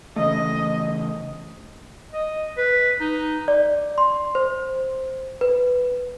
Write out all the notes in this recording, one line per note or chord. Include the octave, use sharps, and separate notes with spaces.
C#3 E3 A3 D#5
D#5
B4
D#4
D5
C6
C5
B4